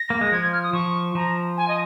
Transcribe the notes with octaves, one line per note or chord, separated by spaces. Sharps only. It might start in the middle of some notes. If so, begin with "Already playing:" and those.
Already playing: A#6
A#3
G#3
F3 G#6
G#6
F6
D#6
F3 C#6
F3 A#5
G#5
D#5